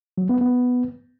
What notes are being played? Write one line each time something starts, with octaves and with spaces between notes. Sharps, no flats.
F#3
B3
B3